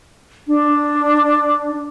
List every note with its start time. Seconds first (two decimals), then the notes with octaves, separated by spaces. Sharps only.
0.47 D4